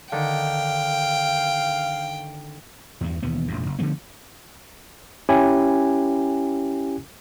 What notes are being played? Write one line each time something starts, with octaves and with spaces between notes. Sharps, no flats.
D3 D#3 F5 G5
E2 G2
E1 D#2 B3
E1 A#1 F#2
F#1
D3 F3 A3 B3
C#4 E4 G4 G#5